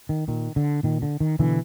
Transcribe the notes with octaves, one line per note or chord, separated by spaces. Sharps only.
D#3
A#2 D#3
D3
A#2 D#3
D3
D#3
B2 D3 E3